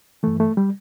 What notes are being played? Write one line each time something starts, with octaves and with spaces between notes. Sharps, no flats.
G2 E3 A3
A3
G3